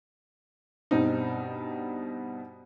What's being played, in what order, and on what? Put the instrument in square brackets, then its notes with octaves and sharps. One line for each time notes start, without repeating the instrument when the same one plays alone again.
[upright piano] G2 B2 G3 C4 D#4